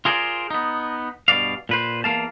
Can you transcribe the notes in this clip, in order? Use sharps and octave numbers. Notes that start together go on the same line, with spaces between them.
F4 G#4 A#4 C5 D5
B3 D#4
G2 B2 D5 F5
A#2 B4 C5
E2 A3 A#3 F5 A5